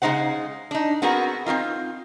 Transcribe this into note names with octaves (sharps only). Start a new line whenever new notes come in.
C#3 G#3 A#3 D#4 C5 F#5
D4 D#4
B3 C4 F#4 G#4 A#4
C4 C#4 D#4 F4